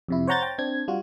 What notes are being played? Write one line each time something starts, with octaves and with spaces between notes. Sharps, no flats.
F2 C3 E4
C5 C#5 F#5 A#5 G6 A6
G5
C4 D4 G#6
G3 F4 F#4